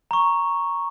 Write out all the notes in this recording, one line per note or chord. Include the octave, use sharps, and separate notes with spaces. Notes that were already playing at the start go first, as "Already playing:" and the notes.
A#5 C#6